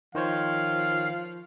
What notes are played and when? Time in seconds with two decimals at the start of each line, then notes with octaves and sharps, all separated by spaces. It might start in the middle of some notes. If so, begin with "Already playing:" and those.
0.15 D#3 F3 C5 C#5 F5